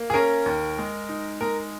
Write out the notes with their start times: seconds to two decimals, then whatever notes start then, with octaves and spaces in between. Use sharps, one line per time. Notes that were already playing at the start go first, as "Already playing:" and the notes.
Already playing: A#3
0.10 G#4
0.14 C#4 A#4
0.46 D#2
0.78 G#3
1.09 D#4
1.41 G#3 A#4